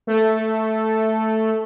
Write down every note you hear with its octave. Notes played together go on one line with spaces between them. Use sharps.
A3 A4